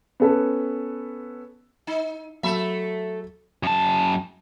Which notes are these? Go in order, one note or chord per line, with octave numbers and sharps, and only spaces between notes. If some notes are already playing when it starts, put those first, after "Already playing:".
B3 C#4 A4 B4
D#4
F#3 A3 E5 B5
F#2 A5